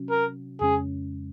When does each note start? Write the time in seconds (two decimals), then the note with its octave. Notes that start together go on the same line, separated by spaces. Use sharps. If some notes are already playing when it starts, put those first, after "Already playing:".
Already playing: C3 F#3 C#4 F#4
0.10 A#4
0.60 F2 C#3 G#3 C#4 G#4